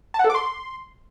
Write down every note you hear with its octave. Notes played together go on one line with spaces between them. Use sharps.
A5
F#5
A4
D6
C6